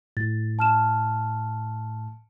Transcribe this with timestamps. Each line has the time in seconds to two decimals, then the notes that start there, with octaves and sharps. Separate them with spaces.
0.17 A2 A6
0.59 A5 F6 E7